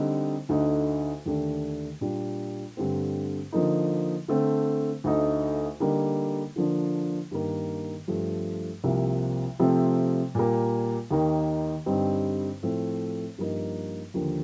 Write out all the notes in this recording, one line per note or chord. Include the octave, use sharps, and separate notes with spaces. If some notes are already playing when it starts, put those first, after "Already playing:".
Already playing: D3 G3 C4 D#4
D2 D3 A3 D#4
D#2 D3 A3 D4
A#2 G3 D4 F4
G2 D3 A3 C4
D3 F3 A#3 D#4
D3 A3 C4
D2 D3 A3 D#4
D3 G3 A#3 D#4
D3 F3 A#3 D4
G2 D#3 A#3
G2 F3 A3
C2 C3 F3 A#3
C3 F3 A3 C4
A#2 G3 A#3
D#2 D#3 A#3 D#4
G2 D3 G3 C4 D#4
A2 F3 A3 C4
G2 F3 A#3 D#4
D#2 D3 F3 A#3